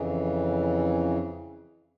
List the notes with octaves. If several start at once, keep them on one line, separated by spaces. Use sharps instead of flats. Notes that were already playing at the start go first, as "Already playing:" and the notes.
Already playing: F2 C#3 E3